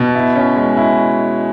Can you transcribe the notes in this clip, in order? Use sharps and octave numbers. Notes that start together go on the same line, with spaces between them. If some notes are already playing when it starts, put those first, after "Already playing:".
Already playing: B2
E4
C#4
G#3
E4